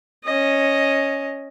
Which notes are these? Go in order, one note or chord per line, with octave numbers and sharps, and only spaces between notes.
C#4 D#5